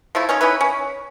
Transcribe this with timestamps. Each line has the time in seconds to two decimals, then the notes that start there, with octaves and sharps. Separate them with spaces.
0.15 F3 A3 E4
0.29 C#4 D#4 C#5
0.41 C#4 D#4 E4 B4
0.61 C#4